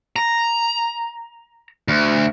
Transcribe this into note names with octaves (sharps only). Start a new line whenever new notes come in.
A#5
D2